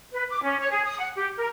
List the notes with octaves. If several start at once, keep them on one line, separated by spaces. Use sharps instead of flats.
B4
D6
C#4
C#5
G#4
D#6
F#5
G4
A#4